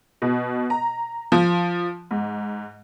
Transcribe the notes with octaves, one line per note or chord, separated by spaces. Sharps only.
B2
A#5
F3
G#2